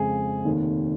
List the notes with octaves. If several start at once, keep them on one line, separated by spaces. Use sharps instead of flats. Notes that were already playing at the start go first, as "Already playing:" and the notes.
Already playing: F2 C#3 G#3 G#4
F1 D#2 D#3